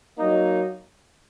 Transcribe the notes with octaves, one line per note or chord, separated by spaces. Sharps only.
F#3 A#3 D#4